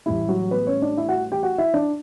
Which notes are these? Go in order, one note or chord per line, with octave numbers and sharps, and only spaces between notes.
A1 A2 G3 E4
F#3 F#4
B3 B4
C#4 C#5
D4 D5
E4 E5
F#4 F#5
G4 G5
F#4 F#5
E4 E5
D4 D5